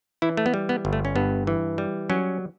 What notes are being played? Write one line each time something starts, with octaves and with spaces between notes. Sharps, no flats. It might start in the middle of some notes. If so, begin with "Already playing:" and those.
E3 E4
A3
B3
G3
B3
G1
A3
C#4
G2 B3
E3
G3
F#3 C#4